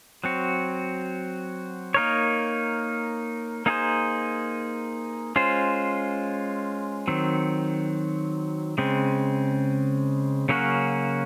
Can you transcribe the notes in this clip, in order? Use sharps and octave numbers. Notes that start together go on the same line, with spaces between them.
F#3 C4 F#4
A#3 D#4 A#4 C#5
A#3 D#4 G#4 C5
G#3 C#4 F4 C5
D#3 F#3 C4
C#3 G#3 C4
C#3 F#3 A#3 C#4 F#4